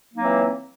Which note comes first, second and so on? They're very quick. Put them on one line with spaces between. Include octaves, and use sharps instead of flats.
A#3 F#3 D#4 C4 E3